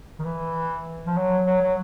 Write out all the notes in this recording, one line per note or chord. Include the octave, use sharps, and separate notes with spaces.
D#3
E3
F3
F#3
F#3
F#3